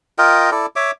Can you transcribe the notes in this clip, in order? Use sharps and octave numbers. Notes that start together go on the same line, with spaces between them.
F4 A#4 D#5 G5
E4 A4 D5
C#5 E5 D6